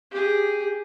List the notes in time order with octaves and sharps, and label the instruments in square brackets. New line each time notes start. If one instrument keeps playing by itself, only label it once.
[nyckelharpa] G4 G#4